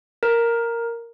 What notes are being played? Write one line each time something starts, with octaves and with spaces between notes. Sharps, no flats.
A#4